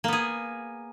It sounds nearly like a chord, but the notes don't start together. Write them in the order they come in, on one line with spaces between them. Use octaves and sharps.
A#3 B3 G#4